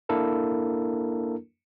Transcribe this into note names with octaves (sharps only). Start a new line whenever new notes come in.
A#3 D4 E4 A4 A#4